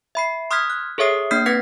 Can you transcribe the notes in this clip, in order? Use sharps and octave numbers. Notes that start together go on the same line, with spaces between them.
E5 B5 C7
C6 D#6 F6 F#6 G#6 B6
F#6
G#4 A4 C#5 E5 D#6 C7
A#3 D4 F6 G6 C7
C4 B4 F#5 G#6 B6